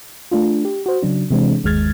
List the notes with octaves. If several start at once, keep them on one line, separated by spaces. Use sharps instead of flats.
A3 D4 F4
G4
F#4 C5
C#3 F#3 D4
C3 E3 G#3 C4 D4
G1 D#2 G#3 F6 G#6 A6